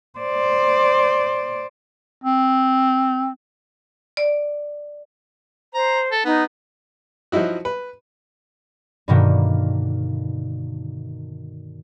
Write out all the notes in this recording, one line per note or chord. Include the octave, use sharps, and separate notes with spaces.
C5 D5
C4
D5
C5 A#5
A4
B3 D#4
F3 F#3 D#4 E4 F#4
B4
G2 B2 D3 D#3 A#3 B3